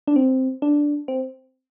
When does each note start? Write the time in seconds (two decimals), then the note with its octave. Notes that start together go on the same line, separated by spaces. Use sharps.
0.07 D4
0.16 C4
0.62 D4
1.08 C4